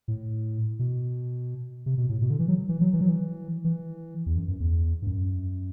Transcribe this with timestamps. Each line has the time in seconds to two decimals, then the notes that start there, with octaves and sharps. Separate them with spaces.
0.08 A2
0.79 B2
1.86 C3
1.97 B2
2.09 A2
2.22 B2
2.30 D3
2.39 E3
2.48 F#3
2.69 E3
2.81 F#3
2.93 E3
3.01 F#3
3.09 E3
3.64 E3
4.26 E2
4.36 F#2
4.48 F#2
4.60 E2
5.02 G2
5.07 F#2